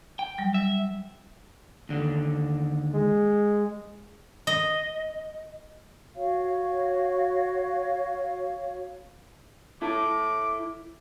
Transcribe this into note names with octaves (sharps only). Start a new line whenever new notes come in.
G5
F#3 G3
E5
D#2 D3
G#3
D#5
F#4 C#5 F5
E4 A4 D6